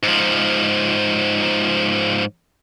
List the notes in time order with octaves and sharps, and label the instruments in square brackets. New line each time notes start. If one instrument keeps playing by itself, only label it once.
[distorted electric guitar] G#2 F3